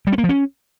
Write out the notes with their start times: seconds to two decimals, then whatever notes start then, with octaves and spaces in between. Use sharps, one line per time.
0.07 G3
0.12 C#4
0.18 A#3
0.24 F3
0.29 C#4